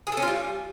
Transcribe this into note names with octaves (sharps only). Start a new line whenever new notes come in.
G#4
A4
C#4
F4
G3